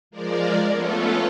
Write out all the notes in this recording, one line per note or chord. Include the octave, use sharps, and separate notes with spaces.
F3 G#3 A#4 D5
A3 B3 C#4 F4 A4